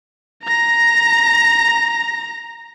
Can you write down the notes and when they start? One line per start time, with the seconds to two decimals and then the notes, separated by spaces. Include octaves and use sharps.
0.43 A#5 A#6